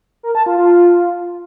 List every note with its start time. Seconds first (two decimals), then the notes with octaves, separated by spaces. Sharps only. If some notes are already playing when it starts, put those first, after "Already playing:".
0.23 A#4
0.35 A5
0.46 F4
0.58 F4